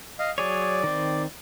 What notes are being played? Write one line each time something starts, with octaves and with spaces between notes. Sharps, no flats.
D#5 F5
F#3 G#4 C#5 D5
D#3 C4